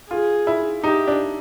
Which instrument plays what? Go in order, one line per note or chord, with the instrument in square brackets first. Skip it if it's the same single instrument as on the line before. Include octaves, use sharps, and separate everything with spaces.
[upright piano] F4 [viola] G#4
[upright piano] E4
[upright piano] D#4 [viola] G4
[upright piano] D4